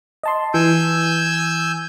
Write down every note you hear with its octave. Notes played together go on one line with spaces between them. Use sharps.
D#5 A5 C6
E3 G#5 E6 G6